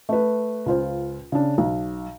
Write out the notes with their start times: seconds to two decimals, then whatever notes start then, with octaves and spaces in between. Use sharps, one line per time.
0.09 A3 B4
0.66 C#2 F4 C5
1.32 C#3 D4
1.58 B1